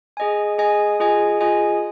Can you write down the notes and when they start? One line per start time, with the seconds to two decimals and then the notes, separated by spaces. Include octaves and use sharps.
0.17 G#4 D#5 G#5
0.58 G#4 D#5 G#5
1.00 F4 G#4 D#5 G#5
1.41 F4 G#4 D#5 G#5